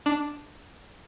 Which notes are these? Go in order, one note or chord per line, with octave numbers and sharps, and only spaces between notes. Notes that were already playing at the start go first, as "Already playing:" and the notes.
D4